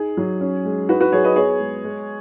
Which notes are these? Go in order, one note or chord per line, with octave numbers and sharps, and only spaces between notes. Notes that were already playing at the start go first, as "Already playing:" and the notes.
Already playing: D#4 G#4
F#3
C#4
G#3
D#4 F#4 B4
F#4 B4
F#3 G#4 C#5
B4 D#5
B3 G#4 C#5
G#3
G#3